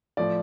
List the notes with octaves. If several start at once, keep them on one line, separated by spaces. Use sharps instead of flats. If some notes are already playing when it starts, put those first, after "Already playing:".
A2 F3 D5